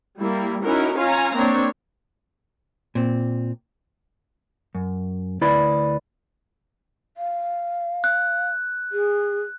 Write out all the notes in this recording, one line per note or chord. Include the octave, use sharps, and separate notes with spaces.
G3 A#3 E4
C#4 D#4 E4 F#4 A#4
C#4 F4 F5 G#5 A#5
A#3 C4 D4 C#5
A#2 C4
F#2
D2 E4 B4 D5 B5
F5
F#6
G#4